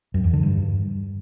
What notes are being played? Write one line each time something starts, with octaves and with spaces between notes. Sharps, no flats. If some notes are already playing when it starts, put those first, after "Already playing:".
F#2
E2
D3
G2